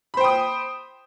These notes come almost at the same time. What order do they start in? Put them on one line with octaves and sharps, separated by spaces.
B5 C5 G5 D#6